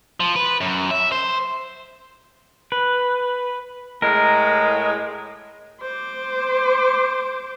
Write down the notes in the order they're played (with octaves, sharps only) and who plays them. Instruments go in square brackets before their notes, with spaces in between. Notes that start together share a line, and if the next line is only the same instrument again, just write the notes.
[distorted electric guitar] F3
B4
F#2
E5
C5
[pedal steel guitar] B4
[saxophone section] A2 G#3 [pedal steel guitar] A#4
[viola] C5 D6